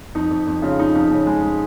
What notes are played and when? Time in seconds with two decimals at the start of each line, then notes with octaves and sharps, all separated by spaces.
0.15 F2 D#4
0.30 F2
0.47 F2
0.62 C#3 F4
0.79 F2 D#4
0.95 F2 D#4
1.11 C#3
1.26 G#3
1.43 G#3